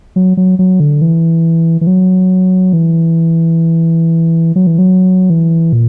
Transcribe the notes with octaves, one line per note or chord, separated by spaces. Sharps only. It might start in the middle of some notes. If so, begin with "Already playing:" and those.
F#3
F#3
F#3
D3
E3
E3
F#3
E3
F#3
E3
F#3
E3
A#2